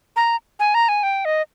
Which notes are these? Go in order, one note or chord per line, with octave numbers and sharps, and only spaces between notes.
A#5
G#5
A#5
G#5
G5
D#5